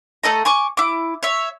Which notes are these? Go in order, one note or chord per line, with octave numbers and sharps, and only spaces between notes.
A3 A4 D#5 A#5
G#5 C#6 D6
E4 D6
C#5 E5